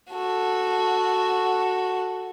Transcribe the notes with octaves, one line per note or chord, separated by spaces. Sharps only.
F#4 A4